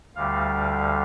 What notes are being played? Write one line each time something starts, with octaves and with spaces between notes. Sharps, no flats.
D2 D3 G3 F5